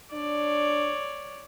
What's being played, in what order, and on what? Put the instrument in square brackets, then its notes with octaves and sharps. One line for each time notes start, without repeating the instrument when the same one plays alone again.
[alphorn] D4 [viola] C#5 D5